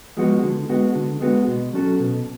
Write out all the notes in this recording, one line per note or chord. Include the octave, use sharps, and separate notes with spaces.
F3 G#3 B3 F#4
D3
G#3 B3 F#4
D3
G#3 B3 F#4
B2
F#3 C#4 F#4 A4
B2